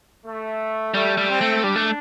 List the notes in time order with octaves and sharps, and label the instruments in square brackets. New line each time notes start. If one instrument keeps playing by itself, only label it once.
[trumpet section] A3
[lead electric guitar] G3 [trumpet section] A3
[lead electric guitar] G3
[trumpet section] C4
[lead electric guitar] A3
[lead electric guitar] G3 [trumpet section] D4
[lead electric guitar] A3